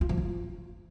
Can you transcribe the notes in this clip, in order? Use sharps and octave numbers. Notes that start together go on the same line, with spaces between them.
F4
F3
F4